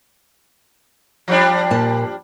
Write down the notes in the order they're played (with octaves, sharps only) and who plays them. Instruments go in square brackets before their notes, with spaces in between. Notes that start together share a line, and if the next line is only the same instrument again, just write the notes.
[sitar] F3 G3 D4
[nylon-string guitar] A#2 A5